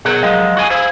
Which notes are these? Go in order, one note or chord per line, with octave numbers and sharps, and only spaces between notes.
B2 G#4 A#4 C#5 F#5 G6
F3 F#3 G#3 D#5 F5 G5
F#4 G#4 G#5
E4 G#4 C5 F5